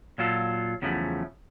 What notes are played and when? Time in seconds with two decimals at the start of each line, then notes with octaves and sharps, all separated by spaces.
0.18 A#2 F#3 F4 A4
0.82 E2 C#3 F3 F#3 A3